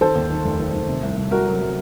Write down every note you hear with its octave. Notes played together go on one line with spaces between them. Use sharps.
D#3 A4 C5
D#2
D#3
F1
D#3
D#3
C3
C2
C2
C2 F#4 A#4
F#3
F#3